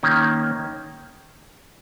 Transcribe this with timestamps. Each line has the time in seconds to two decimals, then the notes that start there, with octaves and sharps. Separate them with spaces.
0.03 D#3 A#3 C#4